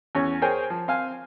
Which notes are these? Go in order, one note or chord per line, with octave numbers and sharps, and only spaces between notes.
E2 C#4 C#5
G#4 A#4 C5 C#5 G5 G#5
F3
C4 F5 G#5